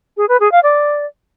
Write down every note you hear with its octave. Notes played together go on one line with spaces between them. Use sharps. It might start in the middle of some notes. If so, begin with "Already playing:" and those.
G#4
B4
G#4
F5
D5